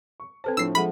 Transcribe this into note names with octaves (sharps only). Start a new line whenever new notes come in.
C#6
C4 A4 B4 C5 A5
A2 F3 A3 D4 C5 E6 C7
F3 G#3 A4 E5 F#5 B5